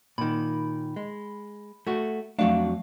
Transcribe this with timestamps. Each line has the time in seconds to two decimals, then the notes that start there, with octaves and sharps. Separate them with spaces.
0.18 A#2 D#3 B5
0.96 G#3
1.87 A3 F#4
2.39 F2 F#3 A3 D4 F5